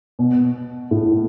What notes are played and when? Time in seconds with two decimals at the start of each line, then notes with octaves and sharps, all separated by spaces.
0.19 B2
0.91 A2